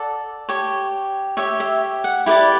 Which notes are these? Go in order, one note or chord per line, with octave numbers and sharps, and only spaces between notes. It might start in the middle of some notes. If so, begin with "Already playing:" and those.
Already playing: A4 D5 F#5
G4 C#5
G4 C#5 E5
E5
F#5
E4 G4 B4 D5 E5